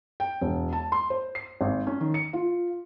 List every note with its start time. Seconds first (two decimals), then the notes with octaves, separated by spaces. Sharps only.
0.20 G5
0.41 E1
0.73 A5
0.92 C6
1.10 C5
1.35 C7
1.61 G#1
1.87 C#4
2.01 D#3
2.14 C#7
2.33 F4